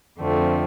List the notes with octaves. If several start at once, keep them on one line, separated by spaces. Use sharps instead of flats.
F2 D3 F3 A3 C4